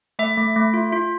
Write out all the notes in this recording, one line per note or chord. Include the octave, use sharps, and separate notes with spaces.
A3 E5
A3
A3
F4
F4